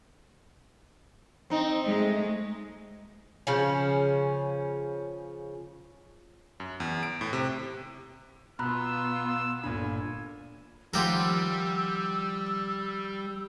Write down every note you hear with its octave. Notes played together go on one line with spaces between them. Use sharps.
C4 D#4
G#3 A3
C#3 F3 C#4
F#2
E2
D7
A2
C3
B2 B3 F4 A#5 B5 E6 F#6
G1 A#2 D4 G#5 B5
D#3 F3 G3 F4 G4 A#4 F#5 E6